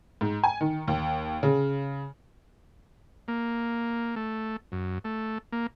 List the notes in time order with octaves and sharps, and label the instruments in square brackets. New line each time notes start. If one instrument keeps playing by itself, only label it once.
[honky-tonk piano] G#2
G#5
D#3
D#2
C#3
[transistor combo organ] A#3
A3
F#2
A3
A#3